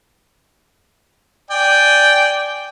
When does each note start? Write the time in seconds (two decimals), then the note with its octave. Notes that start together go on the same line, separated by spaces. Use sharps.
1.51 D5 G5 G#5